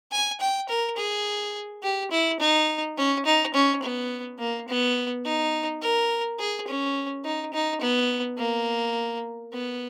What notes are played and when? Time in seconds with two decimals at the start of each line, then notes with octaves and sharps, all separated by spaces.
0.12 G#5
0.40 G5
0.69 A#4
0.97 G#4
1.83 G4
2.11 E4
2.40 D#4
2.97 C#4
3.26 D#4
3.54 C#4
3.82 B3
4.39 A#3
4.68 B3
5.25 D#4
5.82 A#4
6.39 G#4
6.67 C#4
7.24 D#4
7.53 D#4
7.81 B3
8.38 A#3
9.53 B3